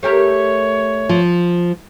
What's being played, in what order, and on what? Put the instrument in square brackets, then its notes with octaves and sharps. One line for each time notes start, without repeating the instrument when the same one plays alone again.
[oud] A3 G4 A#4 [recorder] C#5
[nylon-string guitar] F3